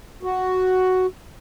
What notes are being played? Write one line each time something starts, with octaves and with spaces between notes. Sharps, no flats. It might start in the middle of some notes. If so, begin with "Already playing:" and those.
F#4